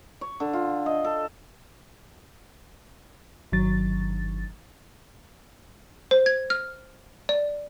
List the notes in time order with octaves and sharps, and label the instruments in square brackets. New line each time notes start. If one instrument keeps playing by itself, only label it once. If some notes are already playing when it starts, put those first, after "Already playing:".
[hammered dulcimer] C#5
D3
F4
D#5
A4
[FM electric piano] G1 D#3 F#3 A6
[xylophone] C5
G#6
F6
D5